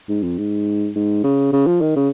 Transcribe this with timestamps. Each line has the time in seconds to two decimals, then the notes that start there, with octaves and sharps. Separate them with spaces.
0.09 G#2
0.23 F2
0.38 G#2
0.95 G#2
1.24 C#3
1.53 C#3
1.67 F3
1.81 D#3
1.96 C#3